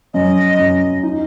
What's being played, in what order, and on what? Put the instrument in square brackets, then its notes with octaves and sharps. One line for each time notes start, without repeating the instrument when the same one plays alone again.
[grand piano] F#2 [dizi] D#5
[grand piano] F#2
D#4